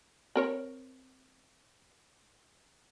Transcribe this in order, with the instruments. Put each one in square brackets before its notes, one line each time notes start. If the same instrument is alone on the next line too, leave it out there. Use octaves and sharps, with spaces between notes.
[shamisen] C4 A#4 C#5